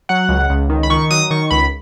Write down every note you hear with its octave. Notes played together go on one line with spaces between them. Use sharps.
F#3 F#5
C#2
C#2
D#3
B5
D#3 C#6
F#3 D#6
D#3 C#6
C#2 B5